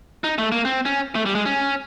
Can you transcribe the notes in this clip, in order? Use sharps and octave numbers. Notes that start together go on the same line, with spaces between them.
D#4
A3
A#3
C4
C#4
A3
G3
G#3
C#4